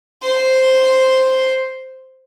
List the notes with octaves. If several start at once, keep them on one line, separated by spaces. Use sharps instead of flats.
C5 C6